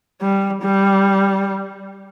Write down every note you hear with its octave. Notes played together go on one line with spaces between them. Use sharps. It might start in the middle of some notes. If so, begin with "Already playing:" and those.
G3
G3